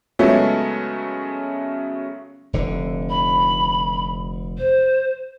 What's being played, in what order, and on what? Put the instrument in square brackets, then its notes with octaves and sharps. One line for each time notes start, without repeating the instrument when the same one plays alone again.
[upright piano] C#3 F#3 G#3 A3 B3 C#4
[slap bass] F1 D3
[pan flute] B5
C5